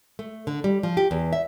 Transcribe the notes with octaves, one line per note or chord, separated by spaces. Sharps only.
A3
D3
G3
F3
G4
E2
E5